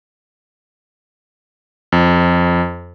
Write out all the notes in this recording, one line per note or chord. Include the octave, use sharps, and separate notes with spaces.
F2